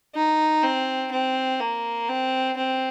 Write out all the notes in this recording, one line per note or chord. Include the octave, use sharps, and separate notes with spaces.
D#4
C4
C4
A#3
C4
C4